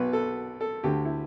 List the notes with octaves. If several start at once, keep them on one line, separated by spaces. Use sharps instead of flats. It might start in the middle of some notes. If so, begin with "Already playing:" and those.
Already playing: B1 B2 B4
A4
A4
D2 D3 G4
E4